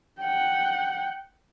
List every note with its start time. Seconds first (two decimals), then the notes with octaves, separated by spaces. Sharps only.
0.21 F#5 G5